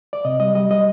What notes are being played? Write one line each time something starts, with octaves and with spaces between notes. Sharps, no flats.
D5
C3 D#5
G3 D#5
G3 D#5
G3 D#5